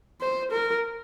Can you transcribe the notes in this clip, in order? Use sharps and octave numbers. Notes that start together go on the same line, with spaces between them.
C5
A#4